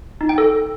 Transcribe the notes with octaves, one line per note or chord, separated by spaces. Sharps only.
D#4
G5
A4